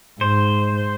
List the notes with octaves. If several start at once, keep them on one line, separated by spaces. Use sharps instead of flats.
G#2 C5